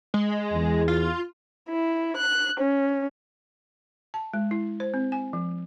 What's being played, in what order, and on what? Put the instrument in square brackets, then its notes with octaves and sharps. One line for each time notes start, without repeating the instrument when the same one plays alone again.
[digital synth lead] G#3
[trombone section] E2
[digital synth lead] F4
[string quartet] E4
F#6
C#4
[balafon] A5
G#3
E4
C5
C4
G#5
F3